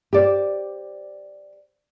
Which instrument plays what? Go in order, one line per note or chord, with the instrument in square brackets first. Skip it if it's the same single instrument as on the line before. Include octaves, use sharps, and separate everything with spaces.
[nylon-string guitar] G4 C5 D5